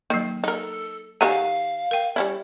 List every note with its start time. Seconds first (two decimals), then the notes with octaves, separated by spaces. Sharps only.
0.10 D#3 F#3 A#3
0.44 D#4 A4 A#4
1.21 D#3 F#4 G4 F5 G#5 A#5
1.91 A#4 G5
2.16 G3 C#4 E4